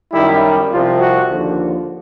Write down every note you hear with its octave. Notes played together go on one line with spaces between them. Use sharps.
F#2 D#3 G3 E4
C2 C3 F3 F4
F#4
D#2 D3 F3